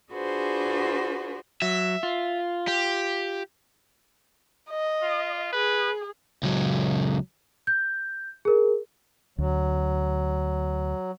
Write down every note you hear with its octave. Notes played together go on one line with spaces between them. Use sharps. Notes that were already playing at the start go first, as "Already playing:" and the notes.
D4 F4 F#4 G#4 B4 C5
F#3 E5
F4
G4
D#5
F4
G#4 B4
C#2 F#3
G6
G#4 A#4
D2 F#3